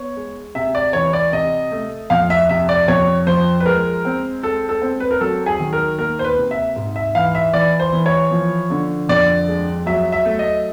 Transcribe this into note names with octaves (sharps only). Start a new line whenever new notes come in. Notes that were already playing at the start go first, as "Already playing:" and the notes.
Already playing: B3 C#5
G#3
C3 E5
D5
E3 C#5
D5
C3 D#5
A3
F2 F5
E5
C3 E5
D5
F2 C#5
F3 C5
B4
G#3 A#4
C4
G#3 A4
A4
C4
B4
A#4
F#3 A4
G#4
D#3
A#4
A#3 A#4
C5
B4
C3
E5
G#2
E5
E3 F5
E5
E3 D5
C5
E3
C#5
F3
D3
F2 D5
G#3
F#3 E5
E5
A3
D#5